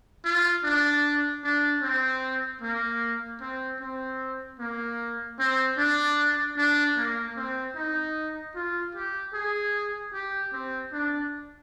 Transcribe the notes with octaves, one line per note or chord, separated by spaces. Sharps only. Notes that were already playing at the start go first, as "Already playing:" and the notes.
F4
D4
D4
C4
A#3
C4
C4
A#3
C4
D4
D4
A#3
C4
D#4
F4
G4
G#4
G4
C4
D4